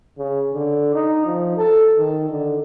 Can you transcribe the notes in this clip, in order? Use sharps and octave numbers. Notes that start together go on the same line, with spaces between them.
C#3
D3
D#4
F3
A4
D#3
D3